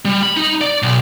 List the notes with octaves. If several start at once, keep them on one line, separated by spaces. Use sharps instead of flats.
G3
B5
D#4
D5
B1